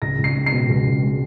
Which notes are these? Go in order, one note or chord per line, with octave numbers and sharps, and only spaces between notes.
C#2 A#6
C#2
C7
G#3
C7
B2
C#2
C#2
G#3